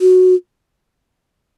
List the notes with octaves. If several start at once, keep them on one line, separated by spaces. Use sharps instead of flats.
F#4